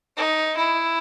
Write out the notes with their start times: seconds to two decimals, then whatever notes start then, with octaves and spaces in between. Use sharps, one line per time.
0.17 D#4
0.57 E4